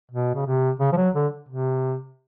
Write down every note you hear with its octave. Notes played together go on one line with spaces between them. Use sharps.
B2
C#3
C3
C#3
F3
F#3
D3
C3